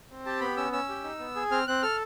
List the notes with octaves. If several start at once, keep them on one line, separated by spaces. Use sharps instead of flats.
C4
G4 A5
B3 B5
C#4 E6
C#4 E6
G4
D#4
B3
G#4
C4 F6
C4 F#6
A4 F6